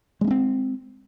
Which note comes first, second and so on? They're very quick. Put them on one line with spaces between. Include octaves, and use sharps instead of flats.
G#3 A#3 C#4 C4